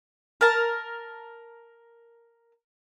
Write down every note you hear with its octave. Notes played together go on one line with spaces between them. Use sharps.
A#4 A5